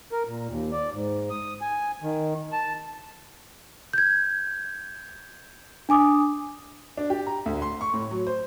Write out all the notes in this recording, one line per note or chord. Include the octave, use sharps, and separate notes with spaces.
A#4
A#2
D#2
D5
G#2
D#6
G#5
D#3
A5
G6 G#6
D4 G#5 D6 D#6
D4
G4
A#5
D2
C6
C#6
A2
F#3
C5